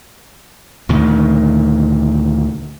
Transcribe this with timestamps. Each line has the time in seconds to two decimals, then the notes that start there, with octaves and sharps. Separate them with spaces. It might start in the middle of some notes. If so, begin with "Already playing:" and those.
0.89 D2 A#2 D#3